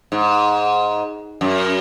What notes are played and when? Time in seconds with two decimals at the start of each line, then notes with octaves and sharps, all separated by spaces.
0.12 G#2
1.41 F#2